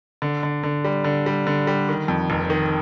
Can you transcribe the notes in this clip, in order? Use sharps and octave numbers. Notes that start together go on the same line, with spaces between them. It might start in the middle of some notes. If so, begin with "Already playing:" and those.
D3
D3
D3
G3
D3
G3
D3
G3
D#3
F2
F1
D#3